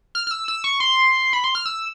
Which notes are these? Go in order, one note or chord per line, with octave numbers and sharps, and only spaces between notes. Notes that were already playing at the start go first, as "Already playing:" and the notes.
F6
F6
E6
E6
C#6
C6
B5
C6
F6
E6